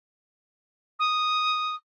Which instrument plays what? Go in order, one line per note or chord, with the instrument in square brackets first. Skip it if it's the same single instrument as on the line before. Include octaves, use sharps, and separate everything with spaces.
[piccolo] D#6